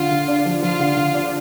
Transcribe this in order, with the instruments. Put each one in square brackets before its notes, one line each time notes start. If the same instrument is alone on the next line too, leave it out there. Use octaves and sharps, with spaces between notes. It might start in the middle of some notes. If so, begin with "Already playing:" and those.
Already playing: [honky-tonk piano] D3 [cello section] F4
[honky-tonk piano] D3
D4
F3
[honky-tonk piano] F3 [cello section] F4
[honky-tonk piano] D3
D3
D4